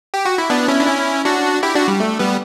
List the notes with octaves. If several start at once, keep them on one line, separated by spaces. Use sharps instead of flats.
G4
F#4
E4
B3 D4
C#4 E4
D4
C#4 E4
D4 F#4
E4 G4
D4 F#4
G3
A3
G3 B3